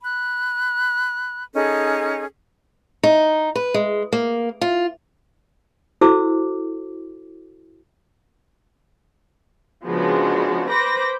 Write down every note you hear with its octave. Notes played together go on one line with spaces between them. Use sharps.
B5 F#6
C#4 D#4 G#4 A4
D#4
B4
G#3
A#3
F4
E4 F#4 A4 C5 D6 E6
C#3 F3 G#3 B3 D4 F#4
B4 C5 B5 D6 G6 A#6